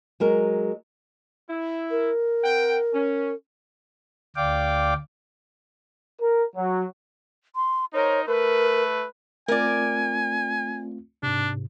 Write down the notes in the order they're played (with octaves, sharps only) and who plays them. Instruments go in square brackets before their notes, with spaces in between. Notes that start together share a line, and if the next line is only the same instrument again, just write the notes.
[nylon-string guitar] F#3 G#3 A#4
[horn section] E4
[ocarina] A#4
[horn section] C4 F#5 G5
C#4
[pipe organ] D2 D5 F5 G5 D6
[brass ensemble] A#4
F#3
[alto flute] C6
[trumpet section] D#4 A#4 C5 [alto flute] C#5
[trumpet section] A3 B4 [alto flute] A#4
[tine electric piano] A3 C4 F4 [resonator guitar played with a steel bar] A#4 D5 [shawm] G#5
[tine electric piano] G#2 C3 [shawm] D4